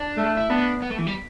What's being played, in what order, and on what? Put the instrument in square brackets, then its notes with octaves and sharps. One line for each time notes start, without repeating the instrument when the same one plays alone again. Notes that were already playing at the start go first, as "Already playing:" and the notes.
Already playing: [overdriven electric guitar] D4
[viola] A3
[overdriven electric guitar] E4
[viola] B3 [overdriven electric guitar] D4
[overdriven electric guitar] B3
A3
E3
G3